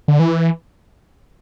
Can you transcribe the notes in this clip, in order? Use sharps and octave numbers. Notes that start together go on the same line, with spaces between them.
D3
E3